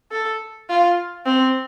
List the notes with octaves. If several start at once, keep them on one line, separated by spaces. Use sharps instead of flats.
A4
F4
C4